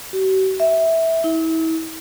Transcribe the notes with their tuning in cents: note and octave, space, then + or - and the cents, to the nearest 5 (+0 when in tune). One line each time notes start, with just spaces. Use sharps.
F#4 +45
E5 -10
E4 -35